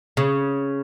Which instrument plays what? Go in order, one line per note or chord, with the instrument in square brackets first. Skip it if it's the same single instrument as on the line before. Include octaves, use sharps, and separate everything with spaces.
[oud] C#3